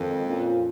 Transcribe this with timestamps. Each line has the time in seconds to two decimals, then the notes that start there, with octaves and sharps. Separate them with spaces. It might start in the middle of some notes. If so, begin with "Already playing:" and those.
Already playing: F2 D#3 G#3
0.25 A#2 F3 C#4 F4